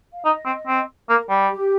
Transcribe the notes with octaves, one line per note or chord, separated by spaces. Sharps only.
F5
D#4 D#5
C4
C4
A#3 A#4
G3
G4